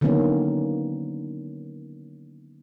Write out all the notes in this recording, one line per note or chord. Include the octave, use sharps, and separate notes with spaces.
D3 D#3 F#3 A#3 B3 C#4